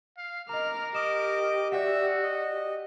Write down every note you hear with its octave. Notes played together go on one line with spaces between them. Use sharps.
F5
A#4 D#5 A#5 D6 F6
G4 D#5 D6 E7
F#4 D5 E5 F#5 E6
D#5